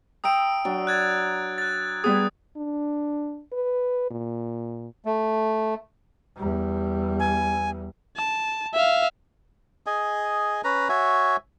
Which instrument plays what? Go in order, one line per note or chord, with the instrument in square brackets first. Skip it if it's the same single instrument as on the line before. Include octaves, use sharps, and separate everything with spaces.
[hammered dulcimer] E5 G5 A#5 [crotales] D#6 E6 D7
[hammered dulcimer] F#3 [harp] D4
[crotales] F#6 G#6 A6
F#6 A6
[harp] G3 B3 G#4 [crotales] D#6
[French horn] D4
B4
A#2
[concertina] A3
[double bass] E2 G3
[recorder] G#5
[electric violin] A5
E5 F5
[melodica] G#4 D#5 G#5
C#4 B4 A#5
F#4 C#5 E5 G#5